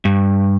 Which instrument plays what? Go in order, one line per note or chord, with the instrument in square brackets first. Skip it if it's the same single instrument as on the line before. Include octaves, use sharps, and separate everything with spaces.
[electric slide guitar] G2